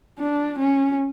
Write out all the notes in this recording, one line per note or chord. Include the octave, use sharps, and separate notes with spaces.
D4
C#4